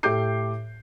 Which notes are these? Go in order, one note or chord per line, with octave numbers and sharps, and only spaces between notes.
A2 G4 A4 D6 G6 C7